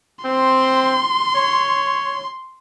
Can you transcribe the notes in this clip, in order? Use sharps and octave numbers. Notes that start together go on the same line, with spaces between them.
C4 C6
C#5